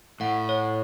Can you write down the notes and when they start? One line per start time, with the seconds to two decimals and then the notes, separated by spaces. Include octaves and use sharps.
0.20 A2 F#5
0.49 C#5